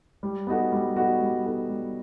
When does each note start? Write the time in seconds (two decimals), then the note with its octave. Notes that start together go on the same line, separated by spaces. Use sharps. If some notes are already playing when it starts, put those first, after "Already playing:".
0.23 G3
0.47 B3 D#4 F#4 A4
0.72 G3
0.96 B3 D#4 F#4 A4
1.21 G3
1.45 B3 D#4 F#4 A4
1.69 G3